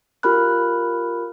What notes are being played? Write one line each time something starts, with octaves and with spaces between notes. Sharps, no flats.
F4 G4 A#4 B5 F6 F#6